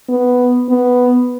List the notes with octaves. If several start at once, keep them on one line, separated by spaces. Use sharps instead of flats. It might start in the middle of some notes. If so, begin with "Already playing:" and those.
B3
B3